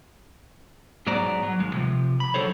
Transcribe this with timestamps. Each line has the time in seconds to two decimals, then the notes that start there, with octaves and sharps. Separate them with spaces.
1.07 G#2 F#3 B3 C5 D5 A#5
1.43 F#3
1.59 D#2 G#3
1.74 C3 F3
2.20 B5
2.34 D3 F#3 F#4 A4 C5 C#5